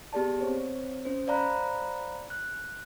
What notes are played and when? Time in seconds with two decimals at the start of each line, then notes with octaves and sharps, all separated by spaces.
0.13 B3 G4 G#4 D5 A5
0.39 C4 C5 C#5
1.05 C#4 C5
1.27 C5 D5 F5 A#5 B5 F#6
2.30 F#6